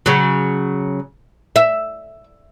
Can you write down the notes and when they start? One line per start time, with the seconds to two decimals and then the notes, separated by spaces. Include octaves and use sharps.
0.06 C#3 F#3
1.56 E5